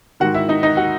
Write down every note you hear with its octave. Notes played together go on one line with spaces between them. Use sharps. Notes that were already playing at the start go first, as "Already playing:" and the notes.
G#2 D#3 F#4 F#5
E4 E5
D#4 D#5
D#4 D#5
F#4 F#5